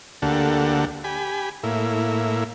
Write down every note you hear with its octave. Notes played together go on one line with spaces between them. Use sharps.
D2 D3 A#3 G4 A4 F#5
G4 G#5 B5
A2 A#3 E4